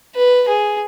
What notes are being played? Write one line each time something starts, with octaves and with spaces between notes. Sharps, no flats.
B4
G#4